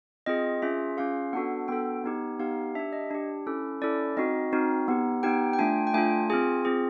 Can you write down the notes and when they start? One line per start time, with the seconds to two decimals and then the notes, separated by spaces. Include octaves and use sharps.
0.26 C4 F4 G#4 D#5
0.62 C#4 F4 G#4 E5
0.97 C#4 F4 G#4 F5
1.33 B3 D4 F#4 A4 F#5
1.68 B3 D4 F#4 A4 G5
2.04 B3 D#4 G4
2.39 B3 D#4 G4 F5
2.75 D4 E5
2.79 G4
2.93 D#5
3.11 D4 G4
3.46 C#4 E4 A4
3.82 C#4 E4 A4 D5
4.17 C4 D#4 F#4 D#5
4.52 C4 D#4 F#4
4.88 B3 D#4 G4
5.23 B3 D#4 G4 G5
5.53 G5
5.59 A3 D4 F4 G#5
5.87 G5
5.94 A3 D4 F4 G#5
6.30 C4 F4 G#4 G#5
6.65 C4 F4 G#4